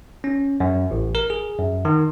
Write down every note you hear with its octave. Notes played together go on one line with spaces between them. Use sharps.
C#4
F#2
A1
A#4
G#4
F#2
D#3